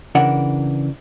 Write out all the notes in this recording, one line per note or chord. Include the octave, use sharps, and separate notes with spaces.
C#3 E3 D4 A#4 F#5